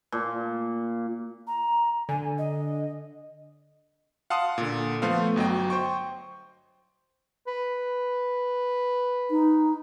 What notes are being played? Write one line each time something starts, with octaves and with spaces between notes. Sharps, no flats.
A#2
A#5
D3 G#5
D#5
F5 F#5 A5 C6 D#6
A#2 D3
F3 A3 B3 C5 F5
G1 F#3 D#5 G5
C5 G5 C#6
B4
D#4